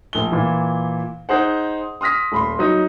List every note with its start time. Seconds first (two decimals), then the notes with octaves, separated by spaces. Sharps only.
0.13 A#1 G7
0.32 A#2 E3
1.29 D#4 G#4 C5 F#5
2.01 C6 D#6 F6 A#6 B6
2.32 D#1 B5 C6
2.59 F#3 D#4